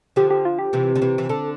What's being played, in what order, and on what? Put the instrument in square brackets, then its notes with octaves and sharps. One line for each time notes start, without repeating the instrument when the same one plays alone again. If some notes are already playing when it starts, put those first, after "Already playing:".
[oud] D3 F3 [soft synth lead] G4
[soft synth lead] G4
F4
G4
[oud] C3 E3
D3
C3 E3
E3
[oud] D3 [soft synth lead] A4